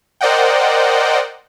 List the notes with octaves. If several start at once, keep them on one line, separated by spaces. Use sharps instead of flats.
A#4 C5 D5 D#5 F#5 G5